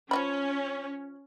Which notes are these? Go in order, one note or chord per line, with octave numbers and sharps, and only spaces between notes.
F3 C#4 E5 B5